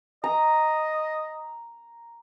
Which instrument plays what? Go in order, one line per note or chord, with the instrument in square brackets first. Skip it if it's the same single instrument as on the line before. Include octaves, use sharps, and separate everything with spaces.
[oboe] D#5 [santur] A#5